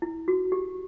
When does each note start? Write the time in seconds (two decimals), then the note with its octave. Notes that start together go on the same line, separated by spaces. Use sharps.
0.02 E4
0.28 F#4
0.52 G4